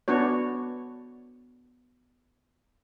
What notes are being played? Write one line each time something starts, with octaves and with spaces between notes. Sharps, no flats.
B3 D4 F#4 C#5